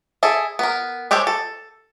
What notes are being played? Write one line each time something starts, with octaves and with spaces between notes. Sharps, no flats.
E4 G#4 A4
B3 A#4
G#3 G4 A4 C5 C#5
A4